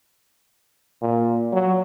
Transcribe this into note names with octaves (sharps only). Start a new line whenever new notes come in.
A#2
F#3